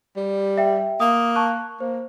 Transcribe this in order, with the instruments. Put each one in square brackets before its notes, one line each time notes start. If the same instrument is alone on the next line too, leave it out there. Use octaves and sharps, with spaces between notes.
[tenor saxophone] G3
[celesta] E5 G5
[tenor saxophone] A#3 [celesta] D#6
[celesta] A5 C#6 F#6
[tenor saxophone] A#3 [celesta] C5